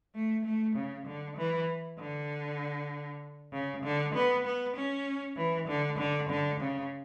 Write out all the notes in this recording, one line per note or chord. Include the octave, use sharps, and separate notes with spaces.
A3
A3
C#3
D3
E3
D3
C#3
D3
B3
B3
C#4
E3
D3
D3
D3
C#3